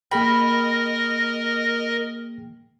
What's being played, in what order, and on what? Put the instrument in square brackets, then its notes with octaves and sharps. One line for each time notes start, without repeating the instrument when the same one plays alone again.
[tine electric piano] A#3 G#4 G5 [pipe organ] A#4 D#5 A#6 [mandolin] B5